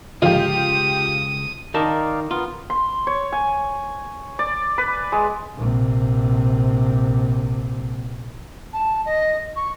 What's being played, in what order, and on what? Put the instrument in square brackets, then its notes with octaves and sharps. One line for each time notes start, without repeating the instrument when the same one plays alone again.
[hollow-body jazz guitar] C#2 [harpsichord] G#2 D3 F3 [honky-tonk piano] F4 G4 [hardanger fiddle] D#6
[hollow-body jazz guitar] D#3 A#4 A5 [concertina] D#4 D5 F5
[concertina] B3 A#4 [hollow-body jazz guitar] F4
[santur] C6
C#5
G#5
D5
B4
G#3
[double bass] A#1 C3
[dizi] A5
D#5
C#6